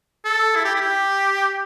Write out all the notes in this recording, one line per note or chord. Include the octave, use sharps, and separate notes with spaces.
A4
E4
G4
E4
G4